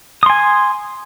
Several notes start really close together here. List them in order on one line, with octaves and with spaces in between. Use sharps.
D#6 C6 G#5